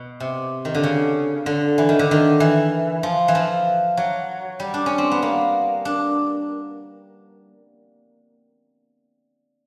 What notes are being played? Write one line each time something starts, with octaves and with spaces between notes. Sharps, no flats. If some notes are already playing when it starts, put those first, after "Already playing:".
Already playing: B2
C3
D#3
D3
C#3
D3
E3
D#3
D3
D#3
E3
F3
E3
F3
F#3
G3
D4
C#4
C4
B3
A#3
D4